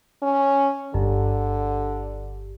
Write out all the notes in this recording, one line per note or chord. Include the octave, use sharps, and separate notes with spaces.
C#4
G1 D3